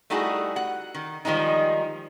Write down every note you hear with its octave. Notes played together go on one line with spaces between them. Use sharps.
G3 A3 D#4 E4 F#4 G#4
F#5
D#3
D#3 F3 G3 G#3 D#4